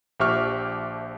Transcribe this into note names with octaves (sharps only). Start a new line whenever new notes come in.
A#1 F3 G4 E5 C#6 F6